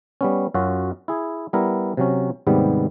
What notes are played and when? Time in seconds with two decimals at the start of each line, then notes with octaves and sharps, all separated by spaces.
0.21 G3 B3 C#4
0.54 F#2 C#4 F4 F#4
1.08 E4 G#4
1.53 G3 B3 E4 A#4
1.97 C3 F#3 C#4
2.47 D#2 G#2 C3 G3 B3